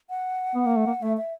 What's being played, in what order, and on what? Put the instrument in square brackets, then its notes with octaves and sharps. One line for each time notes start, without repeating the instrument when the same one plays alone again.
[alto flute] F#5
[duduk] B3
A#3
A3
A#3
[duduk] A3 [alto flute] E5
[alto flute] E5